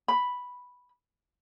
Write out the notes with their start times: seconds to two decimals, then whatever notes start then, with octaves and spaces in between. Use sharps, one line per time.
0.08 B5